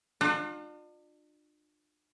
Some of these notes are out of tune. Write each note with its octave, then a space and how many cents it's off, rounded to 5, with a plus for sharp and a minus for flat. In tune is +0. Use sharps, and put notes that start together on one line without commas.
D4 +40 F4 +30